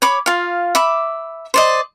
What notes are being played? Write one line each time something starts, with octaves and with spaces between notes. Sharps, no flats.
C#5 B5 D6
F4 F5
E5 B5 D6
C5 D5 D#5